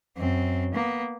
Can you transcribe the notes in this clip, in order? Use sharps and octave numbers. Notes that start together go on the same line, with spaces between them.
F#2 C4
A#3 B3